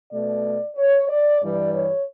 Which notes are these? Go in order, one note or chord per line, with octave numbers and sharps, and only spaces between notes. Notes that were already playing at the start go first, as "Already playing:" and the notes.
B2 A3 D5
C#5
D5
G2 E3 G3 D5
C#5